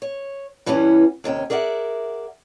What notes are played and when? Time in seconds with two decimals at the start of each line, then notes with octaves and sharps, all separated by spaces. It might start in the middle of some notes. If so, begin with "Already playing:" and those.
0.02 C#5
0.66 G2 E3 G3 B3 C#4 F#4
1.24 D#2 C3 C#4 G5
1.50 G#4 A#4 D5 E5 F#5